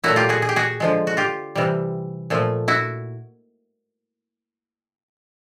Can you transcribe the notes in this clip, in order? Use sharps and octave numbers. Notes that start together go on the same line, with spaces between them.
A#2 F#3 A3 E4 F#4
F4 G4
F#4 G#4
G#4
G4
F#4 G#4
D3 F3 G#3
F#4
F4 G4
C3 E3 G3
A#2 F3 A3
E4 F#4